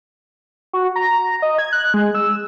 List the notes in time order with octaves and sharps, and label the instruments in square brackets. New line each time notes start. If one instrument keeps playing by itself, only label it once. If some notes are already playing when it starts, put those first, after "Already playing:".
[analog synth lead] F#4
A#5
D#5
G#6
F#6
G#3
E6